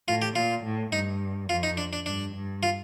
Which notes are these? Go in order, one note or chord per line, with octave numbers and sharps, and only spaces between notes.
A2 F4
G4
A#2 F4
A2
G2 D#4
F2 F4
D#4
D4
D4
G2 D4
G2
F4